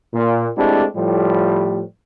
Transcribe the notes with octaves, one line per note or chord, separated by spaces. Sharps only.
A#2
G#3 A3 C4 D4 E4 G4
A2 F3 G3